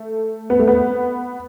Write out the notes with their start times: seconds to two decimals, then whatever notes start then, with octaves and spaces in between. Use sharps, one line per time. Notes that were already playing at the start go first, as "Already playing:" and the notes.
Already playing: A3
0.50 B3
0.59 A3
0.67 B3